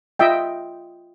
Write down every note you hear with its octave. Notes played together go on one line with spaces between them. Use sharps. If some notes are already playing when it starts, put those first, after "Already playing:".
F4 D#5 E5 G5